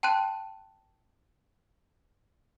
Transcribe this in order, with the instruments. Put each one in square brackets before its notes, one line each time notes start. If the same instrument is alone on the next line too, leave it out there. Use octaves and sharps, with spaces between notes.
[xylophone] G5 A5 C6 F#6 D#7